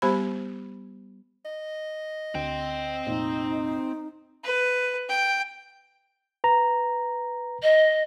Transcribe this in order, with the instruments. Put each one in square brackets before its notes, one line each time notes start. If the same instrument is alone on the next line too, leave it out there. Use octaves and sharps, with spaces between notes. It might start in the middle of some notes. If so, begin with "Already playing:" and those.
[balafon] G3 B3 G4 C5 B5
[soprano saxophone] D#5
[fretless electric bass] D2 [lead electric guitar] C4 G5
[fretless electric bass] F1 A#2 [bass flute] D#4
[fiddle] B4
G5
[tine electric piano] B4 A#5
[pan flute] D#5